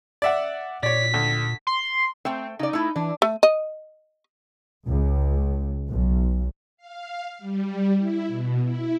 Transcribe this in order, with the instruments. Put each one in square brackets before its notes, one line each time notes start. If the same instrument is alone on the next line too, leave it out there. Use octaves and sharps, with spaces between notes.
[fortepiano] D5 E5 F#5
[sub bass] A#2 [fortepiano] C#5 D5 [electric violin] B6
[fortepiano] D2
[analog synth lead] C6
[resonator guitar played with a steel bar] A3 C5 G5 [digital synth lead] C4
[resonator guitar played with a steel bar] C#3 D5 [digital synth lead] D#4
[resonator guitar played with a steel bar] A3 E4
[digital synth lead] E3 [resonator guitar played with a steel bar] D4
[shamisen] A3
D#5
[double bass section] C#2
B1
[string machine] F5
G3
E4
B2
E4